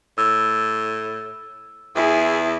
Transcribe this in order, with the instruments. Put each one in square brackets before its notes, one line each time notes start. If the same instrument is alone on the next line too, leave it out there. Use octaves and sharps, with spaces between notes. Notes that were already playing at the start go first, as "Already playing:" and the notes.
[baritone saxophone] A2 [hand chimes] E6
[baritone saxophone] E2 [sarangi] E4 [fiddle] G#4